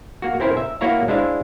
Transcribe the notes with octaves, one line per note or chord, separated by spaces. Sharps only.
A#3 F#4
C4 C#4 E4 A#4 C5
E5
A#3 E4 F#4 C#5 F5 A#5
G#3 D4 E4 C5 E5 F5